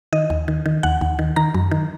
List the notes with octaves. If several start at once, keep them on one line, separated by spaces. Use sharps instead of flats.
D#3 D#5
D#2
D#3
D#3
D#2 F#5
D#2
D#3
D#3 A#5
F#2
D#3